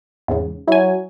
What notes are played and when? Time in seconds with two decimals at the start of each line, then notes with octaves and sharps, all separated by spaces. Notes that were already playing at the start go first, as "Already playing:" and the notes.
0.28 E2 G#2 C#3
0.68 F#3 E4 G#5